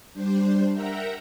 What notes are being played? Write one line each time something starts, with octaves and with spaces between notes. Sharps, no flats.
G3 D4 C5
A#4 E5 F#5 G5 A#5